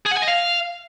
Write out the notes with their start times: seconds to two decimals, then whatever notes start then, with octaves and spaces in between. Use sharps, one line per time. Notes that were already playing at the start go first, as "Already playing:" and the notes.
0.06 G#4
0.11 F#5
0.17 G#5
0.22 D#5
0.28 F5